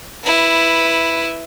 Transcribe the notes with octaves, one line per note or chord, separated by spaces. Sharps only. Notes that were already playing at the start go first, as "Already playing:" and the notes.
E4 B4